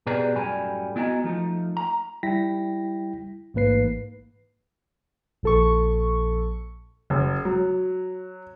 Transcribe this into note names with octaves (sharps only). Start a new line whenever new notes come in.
B2 G4 G#4 B4 D5 A#5
F#2 A2 G3 A4 G#5 B5
B3 E4 F#4 D#5 G#5 A#5
F3 A3 D#4
A#5
G3 E4 G5 A#6 B6
A1 G#2 A#3 B4 C7
A#1 A4 C#6
F#1
F#3